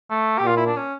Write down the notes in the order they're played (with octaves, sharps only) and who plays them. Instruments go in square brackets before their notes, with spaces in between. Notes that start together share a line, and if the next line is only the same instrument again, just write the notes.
[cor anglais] A3
G4
[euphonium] A#2 [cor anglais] F4
[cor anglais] E4
D4
C#4